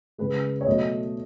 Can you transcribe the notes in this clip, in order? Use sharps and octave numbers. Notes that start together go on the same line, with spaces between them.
C#3 G#3 B4
C#5
B2 F#3 A3 D#5